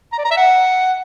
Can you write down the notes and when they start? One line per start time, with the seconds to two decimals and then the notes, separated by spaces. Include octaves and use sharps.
0.13 A#5
0.19 D5
0.25 A#5
0.31 E5
0.37 F#5